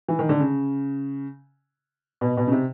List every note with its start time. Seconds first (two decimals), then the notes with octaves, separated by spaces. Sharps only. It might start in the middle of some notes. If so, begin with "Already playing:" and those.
0.08 E3
0.19 D#3
0.29 D3
0.39 C#3
2.21 B2
2.37 B2
2.47 C#3
2.52 C3